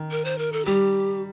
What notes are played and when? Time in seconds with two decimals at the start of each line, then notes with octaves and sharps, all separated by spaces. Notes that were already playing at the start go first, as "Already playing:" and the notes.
Already playing: D#3
0.11 A#4
0.25 C5
0.38 A#4
0.52 A4
0.65 G3 G4